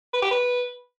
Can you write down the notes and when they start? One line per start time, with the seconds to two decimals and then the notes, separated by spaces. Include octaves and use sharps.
0.13 B4
0.22 G4
0.31 B4